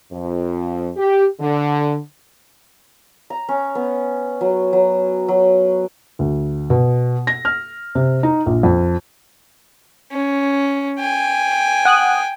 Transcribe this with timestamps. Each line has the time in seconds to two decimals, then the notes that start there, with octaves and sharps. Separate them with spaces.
0.11 F2
0.97 G4
1.40 D3
3.30 A#5
3.49 C#4
3.75 B3
4.41 F#3
4.73 F#3
5.28 F#3
6.19 D2
6.70 B2
7.27 A#6
7.45 F6
7.95 C3
8.23 D#4
8.46 A#1
8.63 F2
10.12 C#4
10.99 G5 G#5
11.85 F#5 D#6 F#6